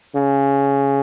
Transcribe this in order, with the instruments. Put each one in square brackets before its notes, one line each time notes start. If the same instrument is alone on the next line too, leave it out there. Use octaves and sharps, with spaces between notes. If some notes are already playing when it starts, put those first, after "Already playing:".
[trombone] C#3